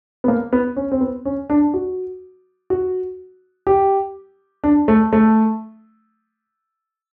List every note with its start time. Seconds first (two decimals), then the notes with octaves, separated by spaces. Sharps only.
0.24 B3
0.28 A#3
0.53 B3
0.76 C#4
0.92 C4
1.01 B3
1.25 C#4
1.50 D4
1.74 F#4
2.70 F#4
3.67 G4
4.64 D4
4.88 A3
5.13 A3